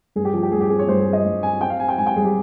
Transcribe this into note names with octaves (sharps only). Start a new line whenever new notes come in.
G2 G#4
G4
F3
G4
G2 G#4
G4
C4 G#4
C#5
G2 C5
G#4
G2
D#5
G2
C4 G#5
C4 G5
F5
C4 G#5
G5
G#2 G#5
G5
G3 G#4
G4